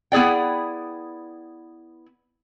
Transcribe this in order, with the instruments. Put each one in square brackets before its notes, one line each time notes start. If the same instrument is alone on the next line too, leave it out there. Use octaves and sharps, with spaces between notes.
[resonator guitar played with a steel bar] B3 E4 G#4 D5 G5